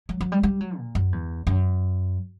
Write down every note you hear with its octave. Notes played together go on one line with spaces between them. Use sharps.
F#3
F#3
G3
G3
F#3
A#2
F#2
E2
F#2